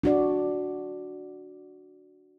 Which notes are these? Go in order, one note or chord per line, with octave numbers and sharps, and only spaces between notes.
D4 F#4 D5